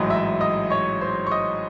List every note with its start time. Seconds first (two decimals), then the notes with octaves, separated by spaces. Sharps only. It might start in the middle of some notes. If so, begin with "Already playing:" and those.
Already playing: A1 G#2 F#3 D#5 D#6
0.10 E5 E6
0.41 D#5 D#6
0.70 C#5 C#6
1.01 C5 C6
1.27 C#6
1.31 D#5 D#6